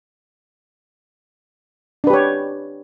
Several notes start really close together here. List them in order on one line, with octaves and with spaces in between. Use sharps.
D4 B4 G4 C#5